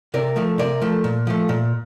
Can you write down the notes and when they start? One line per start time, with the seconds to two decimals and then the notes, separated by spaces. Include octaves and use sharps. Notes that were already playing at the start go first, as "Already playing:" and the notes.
0.14 C3 A#4 D5
0.36 F3 A3
0.58 C3 A#4 D5
0.82 F3 A3
1.04 A#2
1.27 F3 A3
1.49 A#2